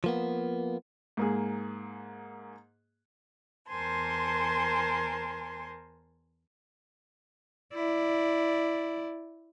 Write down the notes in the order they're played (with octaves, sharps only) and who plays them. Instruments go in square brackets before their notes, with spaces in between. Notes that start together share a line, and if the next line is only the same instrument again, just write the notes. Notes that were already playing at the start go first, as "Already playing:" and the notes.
[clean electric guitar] F3 A#3 B3
[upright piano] G#2 A#3 G#4
[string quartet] E2 A#4 C5 G#5 A5 C6
[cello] E4 D5